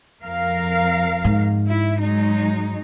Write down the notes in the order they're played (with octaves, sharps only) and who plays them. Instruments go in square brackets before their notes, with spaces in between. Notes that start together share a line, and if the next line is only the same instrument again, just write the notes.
[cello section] F2 A#4 F5
[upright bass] G#2
[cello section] E4
F#3 G#3 D#4